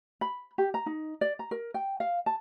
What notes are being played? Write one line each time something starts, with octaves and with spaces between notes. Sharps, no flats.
B5
G4
A#5
D#4
D5
A#5
A#4
G5
F5
A5